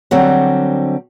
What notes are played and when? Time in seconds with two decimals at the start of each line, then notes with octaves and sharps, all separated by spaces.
0.11 D3 F#3 G3 C4